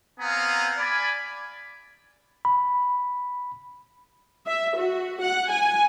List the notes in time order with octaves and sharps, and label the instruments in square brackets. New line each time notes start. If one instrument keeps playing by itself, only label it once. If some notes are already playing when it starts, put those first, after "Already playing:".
[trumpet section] B3 C4 F5 G#5 A#5 D#6
D5 G#5 B5
[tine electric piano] B5
[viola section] E5
F#4
F#5
G#5